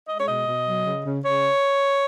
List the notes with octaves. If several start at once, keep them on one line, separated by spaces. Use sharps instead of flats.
G#3 D#5
C#5
B2 D#5
B2
F#3
C#3
C#3
C#3 C#5